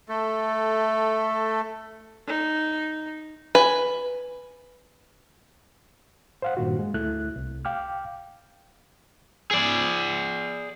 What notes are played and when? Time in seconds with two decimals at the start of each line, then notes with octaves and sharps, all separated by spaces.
0.09 A3 A4
2.27 D#4
3.55 B4 G#5
6.42 C5 F5 F#5
6.57 G2 A#2 D#3 F#4
6.79 G#3
6.94 D2 A3 E4 F#6
7.36 C2
7.65 F5 G5 D6 F6
9.51 G#4 D5